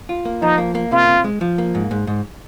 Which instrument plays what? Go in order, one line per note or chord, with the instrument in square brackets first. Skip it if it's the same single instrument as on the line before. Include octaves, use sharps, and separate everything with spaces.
[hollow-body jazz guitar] F4
A#3
[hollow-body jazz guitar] F3 [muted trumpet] D#4
[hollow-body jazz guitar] A#3
A#3
[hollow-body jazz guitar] C3 [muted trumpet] F4
[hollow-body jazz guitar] C3
G#3
F3
A#3
G#2
G#2
G#2